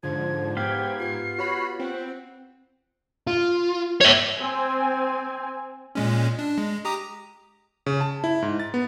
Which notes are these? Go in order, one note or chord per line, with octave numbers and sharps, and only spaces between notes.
G#2 D3 F3 C5 G#6
G#2 B3 G4 F5 G5 G#6
F4 C7
F#4 C#5 B5
C4 F#5
F4
C#5 E5
C4 G#5
A#2 G#3 C#4
D4
G#3
G4 A#5 D#6
C#3
A5
E4
G#2
A6
B3